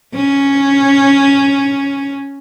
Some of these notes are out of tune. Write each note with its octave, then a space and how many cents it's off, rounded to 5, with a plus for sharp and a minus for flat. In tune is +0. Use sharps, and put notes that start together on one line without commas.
C#4 +0